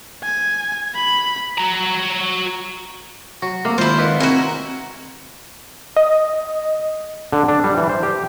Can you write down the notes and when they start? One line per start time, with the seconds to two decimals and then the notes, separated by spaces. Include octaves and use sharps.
0.24 G#5
0.95 B5
1.58 F#4 A#5
3.42 F#3 F#4
3.65 C3 A#3
3.78 D#3 G#3 E4 F4 C5
3.99 D#2 B4 F#5 C6
4.20 C4 E4 F#4 A#4 G#5
5.96 D#5
7.32 D3
7.48 D4
7.64 G3
7.77 E3
7.89 C5
8.03 G4